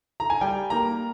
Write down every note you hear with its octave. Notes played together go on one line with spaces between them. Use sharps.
A#5
G#5
G3 G5
A#3 A#5